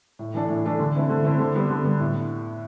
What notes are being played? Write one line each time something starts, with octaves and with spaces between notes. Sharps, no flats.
A2
E3 A3 D4
A2
E3 A3 D4
D3
A3 C4 E4
D3
A3 C4 E4
D3
G3 B3
D3
G3 B3
A2